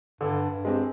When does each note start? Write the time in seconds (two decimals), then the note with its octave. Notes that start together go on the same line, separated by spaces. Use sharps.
0.21 G2 D3
0.51 G2
0.65 G#3 C4 G4